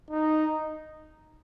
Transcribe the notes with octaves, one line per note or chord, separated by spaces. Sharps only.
D#4